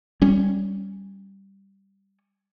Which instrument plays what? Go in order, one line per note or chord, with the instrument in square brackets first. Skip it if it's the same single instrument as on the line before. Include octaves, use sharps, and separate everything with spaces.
[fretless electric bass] G3 C#4